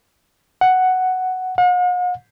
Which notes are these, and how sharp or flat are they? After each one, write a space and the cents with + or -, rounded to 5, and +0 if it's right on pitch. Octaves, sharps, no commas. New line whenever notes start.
F#5 +5
F#5 -45